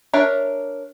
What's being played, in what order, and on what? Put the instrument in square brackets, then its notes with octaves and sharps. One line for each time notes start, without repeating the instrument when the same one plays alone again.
[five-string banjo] D4 A#4 C#5 E5